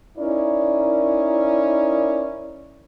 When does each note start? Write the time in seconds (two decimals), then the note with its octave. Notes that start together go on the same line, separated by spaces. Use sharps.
0.18 C#4 D#4 E4 A#4 D5